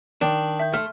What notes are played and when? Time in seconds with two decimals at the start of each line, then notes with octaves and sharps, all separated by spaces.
0.21 D#3 D4
0.60 E5 G6
0.74 A3 C6 F6